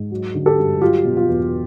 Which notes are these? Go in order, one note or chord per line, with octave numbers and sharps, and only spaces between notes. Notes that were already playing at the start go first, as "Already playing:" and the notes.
Already playing: G#2
F#3
D3
G4 A4
G2
F#3 F4 G4
B2
F4
E2